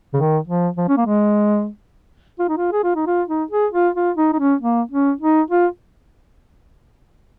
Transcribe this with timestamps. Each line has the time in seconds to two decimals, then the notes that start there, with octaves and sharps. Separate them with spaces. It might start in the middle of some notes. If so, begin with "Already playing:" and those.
0.14 C#3
0.17 D#3
0.47 F3
0.77 F3
0.88 C#4
0.97 A#3
1.06 G#3
2.39 F4
2.49 D#4
2.57 F4
2.72 G#4
2.83 F4
2.95 D#4
3.07 F4
3.28 D#4
3.51 G#4
3.73 F4
3.95 F4
4.17 D#4
4.33 D#4
4.39 C#4
4.61 A#3
4.91 C#4
5.21 D#4
5.50 F4